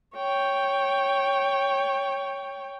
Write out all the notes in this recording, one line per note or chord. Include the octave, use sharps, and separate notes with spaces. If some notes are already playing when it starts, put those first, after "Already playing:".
C#5 G5